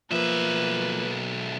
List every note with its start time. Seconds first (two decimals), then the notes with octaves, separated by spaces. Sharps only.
0.11 B1 F3 A#3 B4 E5